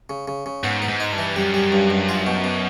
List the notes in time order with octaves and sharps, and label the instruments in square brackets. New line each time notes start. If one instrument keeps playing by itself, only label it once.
[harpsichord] C#3
C#3
C#3
[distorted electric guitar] G#2 [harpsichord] B3
[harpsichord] B3
[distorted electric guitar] G#2
[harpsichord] D#4
[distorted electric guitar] G2
[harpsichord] E3
[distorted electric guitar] F#2 [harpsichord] G3
[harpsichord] G3
G2
G2
F4
B2
B2